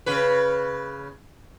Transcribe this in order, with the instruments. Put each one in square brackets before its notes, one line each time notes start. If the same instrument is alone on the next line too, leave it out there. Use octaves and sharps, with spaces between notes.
[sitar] C#3 B4